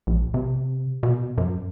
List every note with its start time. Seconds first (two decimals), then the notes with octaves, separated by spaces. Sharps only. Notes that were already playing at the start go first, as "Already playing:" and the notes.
0.07 A#1
0.34 C3
1.03 B2
1.38 F#2